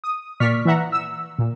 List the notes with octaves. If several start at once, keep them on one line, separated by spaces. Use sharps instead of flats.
D#6
A#2 D5 C#6 F6 B6
E3 E5 F#5 A#5
E6
A#2